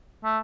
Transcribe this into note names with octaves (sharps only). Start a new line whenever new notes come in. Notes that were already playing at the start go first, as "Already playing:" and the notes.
A3